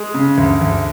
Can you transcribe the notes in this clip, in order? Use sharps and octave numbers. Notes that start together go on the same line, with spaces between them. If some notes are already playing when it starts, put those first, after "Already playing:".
Already playing: G#3 G#4
C#3
D2
D2